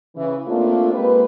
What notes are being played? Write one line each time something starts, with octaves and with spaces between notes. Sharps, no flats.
C#3 E3
A3 A#3 C4 D4 F4
G#3 A#3 C4 G4 B4